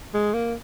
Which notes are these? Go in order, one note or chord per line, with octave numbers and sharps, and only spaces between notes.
G#3
A#3